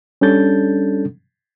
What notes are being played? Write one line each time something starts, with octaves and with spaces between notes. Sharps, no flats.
G3 C#4 D4 A4 G6 A6